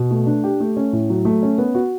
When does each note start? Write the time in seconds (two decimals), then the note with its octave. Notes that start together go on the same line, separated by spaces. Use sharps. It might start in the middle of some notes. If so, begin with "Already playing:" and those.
Already playing: B2
0.11 A3
0.26 D4
0.44 G4
0.60 A3
0.77 C#4
0.93 A2
1.10 F#3
1.25 A3
1.43 C#4
1.58 B3
1.75 F#4